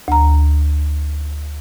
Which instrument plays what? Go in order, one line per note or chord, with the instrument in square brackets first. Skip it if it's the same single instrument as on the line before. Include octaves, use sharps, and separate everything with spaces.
[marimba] D2 A#5